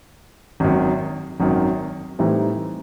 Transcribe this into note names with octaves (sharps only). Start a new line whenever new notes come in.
G#1 F#2 D#3
G#1 F#2 D#3
A2 E3 G3 C4 D#4